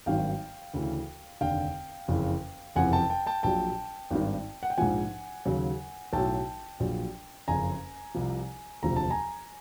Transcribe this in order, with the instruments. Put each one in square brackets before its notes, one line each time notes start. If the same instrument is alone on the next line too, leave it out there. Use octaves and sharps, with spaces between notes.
[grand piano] G#1 G2 D#3 F#3 F5 G5
D2 C#3 E3
F1 D#2 D3 F5 G5
F#1 F2 C#3 E3
F#1 F2 C3 E3 F#5 G#5
G5 A5
G5 A5
G5 A5
A#1 A#2 F#3 G5 A5
G#1 G2 D#3
F#5
G5
A#1 G#2 F3 F#5 G#5
D#2 C#3 F#3
B1 A2 F#3 G5 A5
A#1 A#2 F#3
F#1 F2 C#3 G#5 A#5
C2 C3 F3
E1 D2 C3 F3 A#5
A5
G#5 A#5